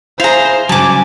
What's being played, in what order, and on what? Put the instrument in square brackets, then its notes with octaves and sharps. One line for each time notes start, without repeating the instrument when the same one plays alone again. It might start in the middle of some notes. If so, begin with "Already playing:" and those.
[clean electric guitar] E4 G#4 [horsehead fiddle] C5 [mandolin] F5 A#5
[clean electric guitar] G2 C#3 F#3 [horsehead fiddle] G#5 [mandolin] A5 D6